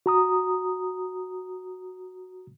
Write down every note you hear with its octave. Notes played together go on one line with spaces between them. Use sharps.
F#4 A#5 D#6